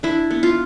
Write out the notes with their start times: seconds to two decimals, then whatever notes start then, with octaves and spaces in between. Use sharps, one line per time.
0.03 D4 E4
0.31 B3
0.43 F4